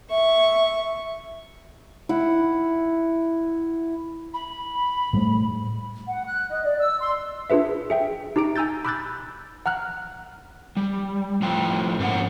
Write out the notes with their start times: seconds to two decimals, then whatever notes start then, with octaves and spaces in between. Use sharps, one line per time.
0.10 E5 C#6
2.09 E4 F#5
4.34 B5
5.13 A2 G3 A3
6.08 F#5
6.27 F#6
6.49 D#5
6.65 D5
6.80 E6
7.00 C6
7.50 D4 F4 G#4 B4 E5
7.90 G#4 E5 G5
8.36 D#4 G4 A#5 D6 D7
8.56 G#5 A#5 E6 G6 A6
8.85 B5 D6 E6 F#6 G6 A6
9.66 F#5 A#5 F6 F#6
10.77 G3
11.42 A2 F3 F4 G5
12.00 G#2 A#3 C4 C#4 F#5